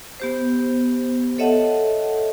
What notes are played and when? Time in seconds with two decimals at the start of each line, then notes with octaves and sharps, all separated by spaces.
0.20 B3 G4 C5
1.38 A4 C#5 D#5 E5 F#5 A5